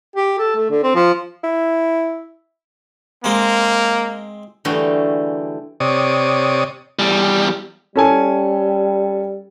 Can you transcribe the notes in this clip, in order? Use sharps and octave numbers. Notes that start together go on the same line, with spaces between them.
G4
A4
A3
D3
C4
F3
E4
G#3 A#3 C4
D3 E3 G3 A3 F#4 G#4
C3 C#5 D5 D#6
E2 G3
G3 C#4 A4 G#5